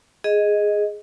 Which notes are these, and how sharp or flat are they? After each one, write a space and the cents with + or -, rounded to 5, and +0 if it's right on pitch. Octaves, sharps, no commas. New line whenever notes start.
G#4 +0 D#5 +0